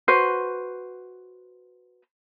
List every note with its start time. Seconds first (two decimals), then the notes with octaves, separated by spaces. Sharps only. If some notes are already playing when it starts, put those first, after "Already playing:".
0.08 F#4 B4 C5